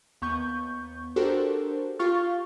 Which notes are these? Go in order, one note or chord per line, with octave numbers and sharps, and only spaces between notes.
D#2 B3 C#6 G6
D4 F#4 G4 A4 A#4 C5
F4 G4 F5 C#6 F6 A6